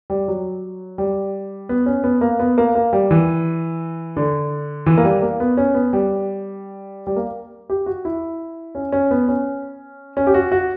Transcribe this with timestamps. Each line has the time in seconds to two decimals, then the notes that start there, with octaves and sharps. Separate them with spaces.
0.10 G3
0.28 F#3
0.98 G3
1.69 B3
1.86 C#4
2.04 B3
2.21 A#3
2.39 B3
2.58 A#3
2.75 A#3
2.93 G3
3.11 E3
4.17 D3
4.86 E3
4.97 A#3
5.04 G3
5.22 A#3
5.40 B3
5.57 C#4
5.74 B3
5.93 G3
7.07 G3
7.16 A#3
7.70 G4
7.86 F#4
8.05 E4
8.75 C#4
8.92 C#4
9.11 B3
9.28 C#4
10.17 C#4
10.27 G4
10.34 F#4
10.52 F#4